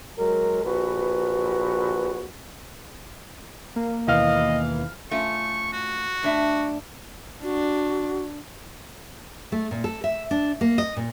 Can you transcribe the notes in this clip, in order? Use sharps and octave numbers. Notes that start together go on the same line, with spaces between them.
F#3 G#3 A#4
A#1 F#4 B4
A#3
D#2 B2 D#3 E3 D#5 F5 F6
A3 C#4 F4 C#6
F#4
A2 D4 E5
D4 F#4
A3
A#2
A4
E5
D4
A#3
D#5
A#2